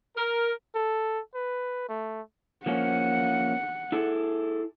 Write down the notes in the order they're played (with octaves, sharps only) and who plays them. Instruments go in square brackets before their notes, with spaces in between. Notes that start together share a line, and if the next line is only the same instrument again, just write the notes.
[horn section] A#4
[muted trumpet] A4
B4
A3
[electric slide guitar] F3 A#3 C#4 [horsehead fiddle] F#5
[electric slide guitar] E4 G#4 A4